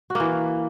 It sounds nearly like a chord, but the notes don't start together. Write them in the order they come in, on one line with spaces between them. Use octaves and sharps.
F#4 A#3 E3